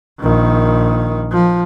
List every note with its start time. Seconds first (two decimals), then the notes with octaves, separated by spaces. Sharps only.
0.21 A#1 D#3
1.31 F3